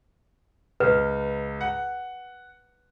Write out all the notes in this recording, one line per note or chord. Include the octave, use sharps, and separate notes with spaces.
C#2 B4
F#5